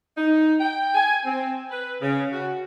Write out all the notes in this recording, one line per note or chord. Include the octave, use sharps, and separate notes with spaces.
D#4
G5
G#5
C4
B4
C#3
F#4